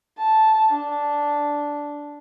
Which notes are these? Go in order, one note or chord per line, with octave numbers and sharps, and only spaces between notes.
A5
D4